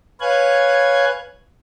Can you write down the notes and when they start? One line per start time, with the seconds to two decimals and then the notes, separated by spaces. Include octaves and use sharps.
0.21 B4 C#5 F5 G#5 F#6 G#6